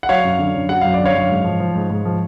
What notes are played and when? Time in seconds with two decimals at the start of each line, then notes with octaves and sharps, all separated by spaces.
0.03 F#5
0.09 F#3 C#5 F5
0.24 F#2
0.39 D3
0.55 F#2
0.69 F#3 F#5
0.81 F#2 F5
0.94 D5
1.00 D3
1.05 C#5 F5
1.15 F#2
1.30 G#2
1.44 F3
1.60 F3
1.75 G#2
1.90 G#2
2.05 F3